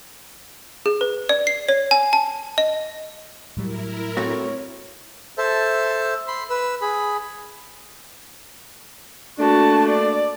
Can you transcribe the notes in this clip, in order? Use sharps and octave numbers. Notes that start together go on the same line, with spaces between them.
G#4
B4
D5
C7
C#5
G#5
A5
D#5
A2 F#3 G3 E4 A#4
A3 C4 F#4 C#5
A4 C5 E5 A5
B5 C6
B4 E6
G#4 B5
A3 A#3 D4 F#4 A5
D5